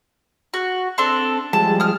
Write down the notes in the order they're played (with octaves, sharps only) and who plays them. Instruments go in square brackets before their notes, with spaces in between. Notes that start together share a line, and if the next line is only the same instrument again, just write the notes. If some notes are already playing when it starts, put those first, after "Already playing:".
[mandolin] F#4
C4 D4 A4
[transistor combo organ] F3 G3 G#3 [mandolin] A5
[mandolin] D#6 F6